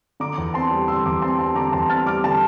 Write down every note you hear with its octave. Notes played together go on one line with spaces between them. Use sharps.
D3 A#5 D6
E2
C4 A5 C6
G3
D3 C6 E6
E2 A#5 D6
C4 A5 C6
G3 A5 C6
D3 A#5 D6
E2 A5 C6
C4 F6 A6
G3 D6 F6
D3 A5